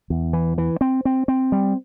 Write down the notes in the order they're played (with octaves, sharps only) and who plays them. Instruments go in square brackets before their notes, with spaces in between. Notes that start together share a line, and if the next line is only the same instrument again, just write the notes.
[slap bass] E2
E3
E3
C4
C4
C4
G3